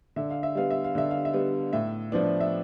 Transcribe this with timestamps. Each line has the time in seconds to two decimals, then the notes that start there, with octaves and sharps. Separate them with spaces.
0.16 D3 E5
0.30 F5
0.43 E5
0.55 G3 B3 F5
0.70 E5
0.84 F5
0.95 D3 E5
1.11 F5
1.25 E5
1.34 G3 B3
1.73 A2 E5
2.12 F3 B3 D4
2.40 E5